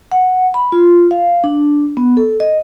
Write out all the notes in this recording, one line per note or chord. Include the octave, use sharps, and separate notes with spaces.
F#5
B5
F4
F5
D4
B3
A4
D#5